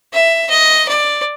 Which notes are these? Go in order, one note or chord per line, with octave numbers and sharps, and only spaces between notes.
E5
D#5
D5